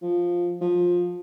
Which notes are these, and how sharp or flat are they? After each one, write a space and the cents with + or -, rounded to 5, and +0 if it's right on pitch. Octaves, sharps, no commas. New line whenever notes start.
F3 +5
F3 +15